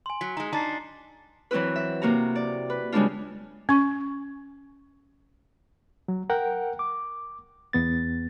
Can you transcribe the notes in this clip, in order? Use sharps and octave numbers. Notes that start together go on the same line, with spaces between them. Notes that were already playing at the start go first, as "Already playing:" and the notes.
G#5 C6
F#3 B6
G#3 D#4 A#5
D4 D#4 A5 A6 C7
E3 F#3 C4 E4 B4
E5
C3 A#3 F#4 A#5
D5
B4
C#3 G3 G#3 B3 D4 F4
C#4 C#6
F#3
A#4 F#5 G5
D6
E2 B3 A6